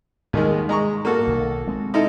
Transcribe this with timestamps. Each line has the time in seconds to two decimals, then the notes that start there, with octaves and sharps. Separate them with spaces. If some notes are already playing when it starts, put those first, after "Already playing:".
0.33 D#2 G#2 D#3 G3 G#3
0.69 G#3 A#5 C#6
1.05 A#3 F#4 A4
1.27 B1 D#3
1.67 G#3 C4
1.94 D#4 E4 A4